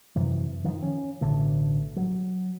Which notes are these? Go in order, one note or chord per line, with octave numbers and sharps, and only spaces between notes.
F#2 C3 E3
D#3 F3
C#4
A1 B2 D3 A3
F#3